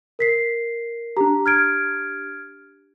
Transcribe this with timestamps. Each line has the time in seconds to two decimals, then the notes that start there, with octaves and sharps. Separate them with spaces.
0.19 A#4 B6 C7
1.17 D4 G4 A#5
1.46 F6 G#6 D7